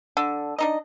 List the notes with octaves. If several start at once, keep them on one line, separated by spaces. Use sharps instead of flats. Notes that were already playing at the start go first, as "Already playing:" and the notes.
D3 A4
D4 D#4 D#5